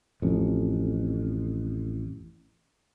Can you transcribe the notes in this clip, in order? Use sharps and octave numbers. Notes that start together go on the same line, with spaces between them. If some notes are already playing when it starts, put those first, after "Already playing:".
A1 F2